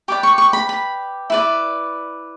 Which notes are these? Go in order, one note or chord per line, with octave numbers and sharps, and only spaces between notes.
G4 B4 D5 D6
C#6
C#6
B5
B5
E4 B4 D5